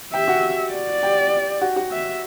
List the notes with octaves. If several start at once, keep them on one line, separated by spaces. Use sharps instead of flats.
G4 E5 G5
F#4 F#5
D5
G4 G5
F#4 F#5
F#4 F#5
E5